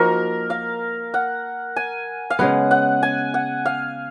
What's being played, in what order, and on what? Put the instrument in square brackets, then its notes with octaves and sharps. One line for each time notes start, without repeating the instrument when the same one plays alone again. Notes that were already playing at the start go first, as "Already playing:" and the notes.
Already playing: [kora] F3 A#3 D#4 F#4 [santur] A#4
[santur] F5
F#5
G#5
F5
[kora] C#3 G#3 B3 [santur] F#5
[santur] F#5
G#5
F#5
F5